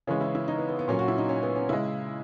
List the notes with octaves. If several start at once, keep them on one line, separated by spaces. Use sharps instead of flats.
C#3 E3 G#3 C#4
E4
E4
D#4
B3
B3
B3
A#2 F#3 C#4
F#4
E4
D#4
C#4
B3
C#4
C#3 G#3 E4